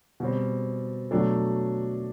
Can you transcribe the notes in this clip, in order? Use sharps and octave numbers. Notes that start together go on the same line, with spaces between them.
B2 G3 C4
B2 F#3 A3 D4 A4